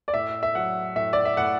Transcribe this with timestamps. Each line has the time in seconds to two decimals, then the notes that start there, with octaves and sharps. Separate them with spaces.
0.08 D5
0.14 A2 E5
0.43 E5
0.55 F#3 F#5
0.96 A2 E5
1.13 D5
1.25 E5
1.37 A2 F#5